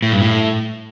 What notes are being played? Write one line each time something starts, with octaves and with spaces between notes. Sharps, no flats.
A2
G2
A2